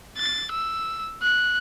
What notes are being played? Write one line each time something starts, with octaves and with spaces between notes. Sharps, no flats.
A6
E6
F#6